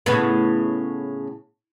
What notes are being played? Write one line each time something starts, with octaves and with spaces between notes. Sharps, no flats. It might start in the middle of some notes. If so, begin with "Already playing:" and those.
A2 C#3 B3